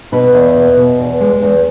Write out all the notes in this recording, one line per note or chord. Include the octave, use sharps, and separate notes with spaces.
B2 B4
E2
B2
B2
E2
G#3
E2